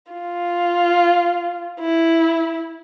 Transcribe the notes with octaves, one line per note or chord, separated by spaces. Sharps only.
F4
E4